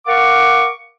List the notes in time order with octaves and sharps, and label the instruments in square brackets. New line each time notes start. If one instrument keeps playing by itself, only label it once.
[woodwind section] A#4 F5 F#5 C#6 D6